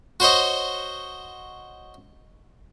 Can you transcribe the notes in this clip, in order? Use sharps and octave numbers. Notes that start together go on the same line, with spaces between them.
F#4 C5 C#5 D#5